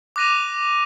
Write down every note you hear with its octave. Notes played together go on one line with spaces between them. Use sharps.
D6 F#6 A#6 D#7 F7